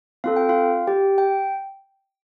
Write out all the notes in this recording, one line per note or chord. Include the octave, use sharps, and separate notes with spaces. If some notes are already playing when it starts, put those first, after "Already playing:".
C4 F4 A4 F5
G5
F4 F5
G4 G5
G5